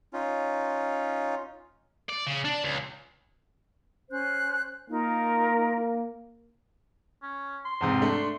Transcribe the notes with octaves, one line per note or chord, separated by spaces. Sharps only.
C#4 D#4 F4
D5
C#3
D4
C#2
C#4 C5 F#6
A#3 D#4 F4 A#4
C#4
C6
E2 G#2 C3
A3 D4